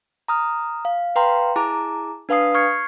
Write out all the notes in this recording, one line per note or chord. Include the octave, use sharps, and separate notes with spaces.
A#5 D#6 F6
F5
B4 F5 G5 A#5 C6
E4 G#4 A5 A#5 D6
D4 B4 F5 A5 D#6 C7
C#6 F6 G#6 C7 C#7